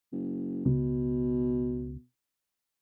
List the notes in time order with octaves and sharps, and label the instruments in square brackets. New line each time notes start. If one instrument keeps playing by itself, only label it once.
[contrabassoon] F#1
[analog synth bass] C#2 [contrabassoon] B2